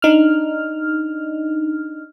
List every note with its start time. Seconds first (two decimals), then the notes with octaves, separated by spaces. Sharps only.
0.02 D4 D#4 F6